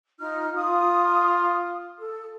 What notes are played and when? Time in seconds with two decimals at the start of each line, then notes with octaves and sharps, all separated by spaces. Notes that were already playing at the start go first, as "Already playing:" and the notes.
0.19 D#4 F4 F6
0.55 F4 D#6
1.99 A4